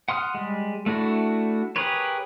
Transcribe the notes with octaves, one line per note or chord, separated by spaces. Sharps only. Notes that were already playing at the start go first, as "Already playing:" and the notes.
F#5 C6 D#6 F6
G3 G#3
A3 D4 E4 F#4
G4 G#4 A#4 B4 C#5